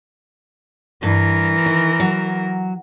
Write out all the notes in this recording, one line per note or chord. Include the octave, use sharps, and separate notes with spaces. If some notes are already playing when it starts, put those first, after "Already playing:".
G2 E3 A#4
D#3
F#3